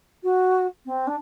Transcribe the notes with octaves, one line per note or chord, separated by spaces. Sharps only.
F#4
C4
D4